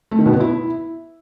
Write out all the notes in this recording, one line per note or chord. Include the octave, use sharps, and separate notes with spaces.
A3
D#3
B2
B3
E4